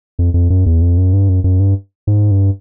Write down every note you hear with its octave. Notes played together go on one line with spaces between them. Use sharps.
F2
F2
F#2
E2
F2
F#2
G2
F#2
F#2
G2
G#2
G2